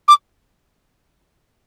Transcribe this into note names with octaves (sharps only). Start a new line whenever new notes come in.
D6